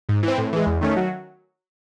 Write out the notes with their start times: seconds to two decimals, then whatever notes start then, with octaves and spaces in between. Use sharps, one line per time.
0.09 G#2
0.23 E3 C4
0.38 A2
0.53 E3 G#3
0.66 E2
0.81 D#3 A3 C#4
0.96 F#3